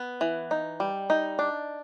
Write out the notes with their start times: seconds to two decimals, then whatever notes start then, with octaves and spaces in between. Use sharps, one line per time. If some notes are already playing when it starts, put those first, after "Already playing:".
Already playing: B3
0.21 E3
0.51 D#4
0.80 G3
1.10 D#4
1.39 D4